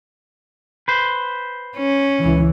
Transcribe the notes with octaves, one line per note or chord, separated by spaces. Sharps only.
B4 C5
C#4
C#2 E3